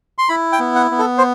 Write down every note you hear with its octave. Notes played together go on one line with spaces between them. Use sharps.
C6
E4 B5
G5
B3
F#5
B3
A4
C5